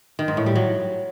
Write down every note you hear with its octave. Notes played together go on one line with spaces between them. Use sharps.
D#3
G#2
A2
G3
F#3